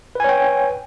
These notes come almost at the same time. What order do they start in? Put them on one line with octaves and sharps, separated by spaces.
B4 G#5 C#5 G5